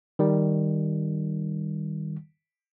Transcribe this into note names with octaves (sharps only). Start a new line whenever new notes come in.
D#3 G3